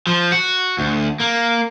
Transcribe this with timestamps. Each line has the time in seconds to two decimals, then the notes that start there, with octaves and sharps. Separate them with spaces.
0.07 F3
0.32 F#4
0.78 D2
1.20 A#3